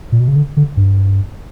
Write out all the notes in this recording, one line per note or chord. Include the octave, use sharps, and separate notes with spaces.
A#2
B2
C#3
D3
D3
G2